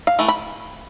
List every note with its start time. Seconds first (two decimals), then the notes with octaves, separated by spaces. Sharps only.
0.07 F5
0.19 E3 A3
0.28 B5